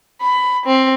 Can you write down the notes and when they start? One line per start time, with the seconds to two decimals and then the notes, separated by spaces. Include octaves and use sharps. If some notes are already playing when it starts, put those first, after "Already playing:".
0.22 B5
0.66 C4